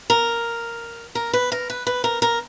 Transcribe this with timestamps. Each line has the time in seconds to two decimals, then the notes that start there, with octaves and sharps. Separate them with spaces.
0.10 A#4
1.15 A#4
1.33 B4
1.52 A#4
1.70 B4
1.87 B4
2.04 A#4
2.22 A#4